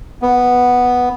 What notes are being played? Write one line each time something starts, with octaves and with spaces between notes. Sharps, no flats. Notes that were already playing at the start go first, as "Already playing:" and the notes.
B3